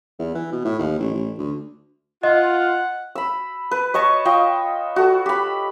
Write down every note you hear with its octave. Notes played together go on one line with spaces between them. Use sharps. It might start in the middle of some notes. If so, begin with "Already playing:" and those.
E2
E3
B2
A2
D#2
A1
A1
D2
F4 D#5 F#5
B5 E6
B4
C#5 D#5 A5 C#6
F4 D#5 G5
F#4 A4
G4 B5